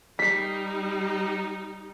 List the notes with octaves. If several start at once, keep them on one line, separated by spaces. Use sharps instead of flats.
G3 D#4 B6 C7